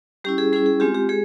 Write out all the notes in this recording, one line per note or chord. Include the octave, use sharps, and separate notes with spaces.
G3 C#4 E4 G4
G#4
G3 C#4 E4 G#4
G#4
G#3 C4 F4 G4
G4
G#3 G#4